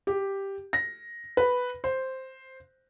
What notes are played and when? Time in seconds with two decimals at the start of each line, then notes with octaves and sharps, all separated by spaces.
0.07 G4
0.73 A#6
1.37 B4
1.84 C5